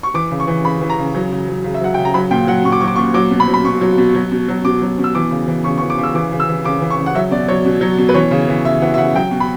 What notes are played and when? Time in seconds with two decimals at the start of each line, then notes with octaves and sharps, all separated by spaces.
0.03 C#6
0.14 E3 D6
0.31 C#3
0.40 C#6
0.47 E3
0.64 C#3 B5
0.81 E3
0.90 A#5
0.98 C#3
1.15 F#3
1.32 C#3
1.48 F#3
1.64 C#3
1.74 E5
1.81 F#3 F#5
1.94 C#3 G5
2.05 A#5
2.14 F#3 B5
2.31 A#2 G5
2.47 F#3 F#5
2.64 A#2 C#6
2.72 D6
2.80 F#3 C#6
2.88 D6
2.96 A#2 C#6
3.14 F#3 D6
3.31 B2
3.40 B5
3.48 F#3
3.54 B5
3.65 B2 C#6
3.81 F#3
3.98 B2
4.15 F#3
4.32 B2
4.48 F#3
4.65 B2 D6
4.82 F#3
4.99 B2
5.04 E6
5.15 E3 D6
5.31 C#3
5.47 E3
5.64 C#3 C#6
5.78 E3 C#6
5.90 D6
5.98 C#3
6.03 E6
6.14 E3 D6
6.32 C#3
6.40 E6
6.48 E3
6.64 C#3 D6
6.81 E3
6.90 C#6
6.98 C#3
7.06 F#5
7.15 F#3 E5
7.31 B2 D5
7.48 F#3 C#5
7.65 B2
7.81 F#3
7.98 B2
8.09 B4
8.14 E3 C#5
8.31 C#3
8.48 E3
8.65 C#3 E5
8.82 E3 F#5
8.94 E5
8.98 C#3 F#5
9.15 F#3 G5
9.31 B2
9.40 B5